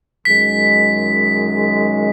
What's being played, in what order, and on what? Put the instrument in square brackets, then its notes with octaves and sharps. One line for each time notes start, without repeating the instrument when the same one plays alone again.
[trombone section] F#2 D#3 G#3 [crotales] B6